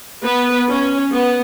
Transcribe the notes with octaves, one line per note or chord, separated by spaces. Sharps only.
B3 B4
C#4
B3